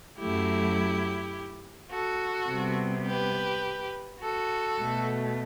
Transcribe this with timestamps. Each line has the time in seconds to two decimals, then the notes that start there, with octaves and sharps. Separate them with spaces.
0.18 F#2 F#3 A3 E4 G4
1.91 F#4 A4
2.48 C3 G3 B3
3.05 G4 B4
4.21 F#4 A4
4.79 B2 A3